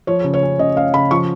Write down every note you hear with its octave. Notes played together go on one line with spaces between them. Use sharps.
F3 C#5
C#3
C#5
C#4
C#3 D#5
C#4 F5
C#3 B5
F3 C#6